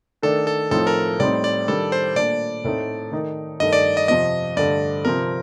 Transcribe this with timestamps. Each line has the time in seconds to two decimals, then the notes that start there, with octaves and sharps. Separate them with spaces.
0.23 D#3 A3 D4 A4
0.47 A4
0.71 A2 F3 C4 D#4 A4
0.87 A#4
1.19 A2 G3 C4 D#4 D5
1.44 D5
1.67 D#3 G3 D4 A4
1.92 C5
2.15 A#2 A3 D4 D5
2.64 A2 A3 C4 D#4
3.12 D#3 A3 D#4
3.60 G2 D#3 A3 D#4 D#5
3.73 D5
3.97 D#5
4.08 F2 C3 F3 D#5
4.57 G2 D3 A3 D5
5.05 C3 F3 C4 A#4